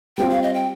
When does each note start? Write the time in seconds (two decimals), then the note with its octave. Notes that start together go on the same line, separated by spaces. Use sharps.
0.18 G3 C4 F4 G5
0.30 F5
0.43 D#5
0.54 G5